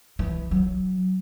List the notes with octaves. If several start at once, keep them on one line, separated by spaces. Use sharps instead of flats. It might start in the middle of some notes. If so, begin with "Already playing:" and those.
E3
F#3